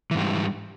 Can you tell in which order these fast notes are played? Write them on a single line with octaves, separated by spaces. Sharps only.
E3 G#2 G3